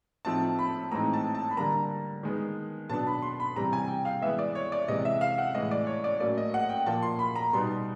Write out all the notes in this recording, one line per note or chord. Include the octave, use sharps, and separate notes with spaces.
A2 F3 A3 C4 D#4 A5
B5
A2 E3 G#3 C4 D#4 A#5
A5
A5
B5
D3 G3 A#3 A#5
D#3 G#3 B3
B2 F#3 B3 D4 A5
B5
C6
B5
C3 E3 G3 C4 A#5
G#5
G5
F5
E3 G#3 B3 E5
D5
C#5
D5
C3 E3 G#3 D#5
E5
F5
F#5
A2 E3 G#3 D#5
D5
C#5
D5
A2 F#3 A#3 C#4 D5
D#5
F#5
G5
A#2 F3 A#3 A5
C6
B5
A#5
B2 G3 B3 D#4 C6